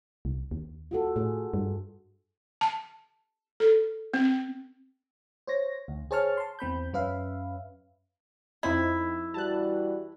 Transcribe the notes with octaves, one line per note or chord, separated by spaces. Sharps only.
C2
D#2
F4 F#4 A4
A2 G#4
G2
A5
A4
C4
C5 C#5 A#6
D2
G#4 C5 C#5 A5 C#6 F6
A5 C6
E2 C4 B5 G6
F#2 C#4 B4 E5 F5
F2 C4 D#4 E4
E3 G3 F#4 A5 F#6